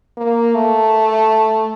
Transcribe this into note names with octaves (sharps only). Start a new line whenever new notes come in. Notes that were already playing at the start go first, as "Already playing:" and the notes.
A#3
A3